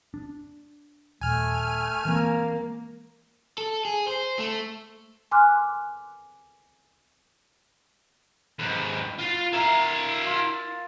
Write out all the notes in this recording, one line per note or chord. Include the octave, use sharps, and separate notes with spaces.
D4
D#1 A3 G#5 F6
E3 G#3 A#3 C4
A4
G#4
C5
A3
G#5 C6 D6 F6 F#6
D#2 G#2 B4
F4 F5
E4 A#4 E5 F5
F4